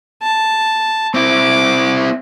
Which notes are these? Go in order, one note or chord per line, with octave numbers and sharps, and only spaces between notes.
A5
C4 E4 D6